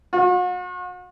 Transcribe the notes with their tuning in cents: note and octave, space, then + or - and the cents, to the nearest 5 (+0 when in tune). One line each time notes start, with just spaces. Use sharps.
F#4 -40